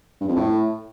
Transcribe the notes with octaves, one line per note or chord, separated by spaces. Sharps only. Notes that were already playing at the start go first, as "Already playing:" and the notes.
G2
F2
A2